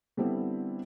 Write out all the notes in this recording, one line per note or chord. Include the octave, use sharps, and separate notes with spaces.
D3 G3 B3 C4 E4